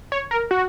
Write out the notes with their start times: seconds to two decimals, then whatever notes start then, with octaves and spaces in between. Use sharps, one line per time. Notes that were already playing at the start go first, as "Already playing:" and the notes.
0.12 C#5
0.31 A#4
0.51 F#4